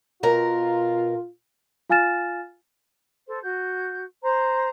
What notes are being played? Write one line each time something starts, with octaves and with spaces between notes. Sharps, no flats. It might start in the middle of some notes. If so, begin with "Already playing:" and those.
B2 F4 A#4 A#5
F4 F5 G#5 F6 A6 E7
A4 C5
F#4 G6
C5 A#5